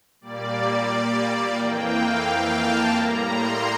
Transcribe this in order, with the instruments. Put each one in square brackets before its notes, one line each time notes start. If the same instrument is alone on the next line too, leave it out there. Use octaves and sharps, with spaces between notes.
[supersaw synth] A#2 G3 A#3 D5
F2 E3 A#3 G5
F5
F5
A5
A2 G3 A#3 A#5
C6